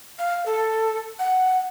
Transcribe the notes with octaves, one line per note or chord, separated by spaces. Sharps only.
F5
A4
F#5